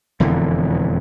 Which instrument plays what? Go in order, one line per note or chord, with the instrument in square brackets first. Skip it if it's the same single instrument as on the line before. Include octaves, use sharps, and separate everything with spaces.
[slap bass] E1 F2 D3 E3